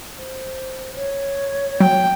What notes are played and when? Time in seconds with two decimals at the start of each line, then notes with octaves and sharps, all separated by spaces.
0.18 C5
0.95 C#5
1.80 F#3 G5